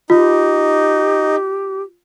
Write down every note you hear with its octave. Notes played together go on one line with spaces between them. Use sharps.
D#4 F4 G4